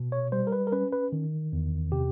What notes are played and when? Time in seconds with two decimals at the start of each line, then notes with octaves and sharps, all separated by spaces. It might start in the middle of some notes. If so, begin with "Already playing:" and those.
Already playing: B2
0.12 C#5
0.32 G3 C5
0.47 A#4
0.52 B4
0.67 A#4
0.72 C#4 B4
0.93 B4
1.12 D#3
1.53 E2
1.92 C3 G4